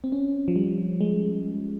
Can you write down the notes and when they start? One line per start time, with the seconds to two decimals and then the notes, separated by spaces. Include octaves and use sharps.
0.04 C4
0.12 C#4
0.48 F3
0.56 G3
1.01 G#3